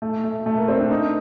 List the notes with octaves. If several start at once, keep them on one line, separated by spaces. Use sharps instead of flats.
A3
A3
A3
A#3
C4
D4
D#4